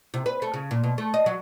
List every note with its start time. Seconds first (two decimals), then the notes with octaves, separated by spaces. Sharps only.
0.14 C3
0.26 B4
0.42 A3
0.54 C#3
0.71 A#2
0.84 B2
0.98 A3
1.14 D#5
1.26 F#3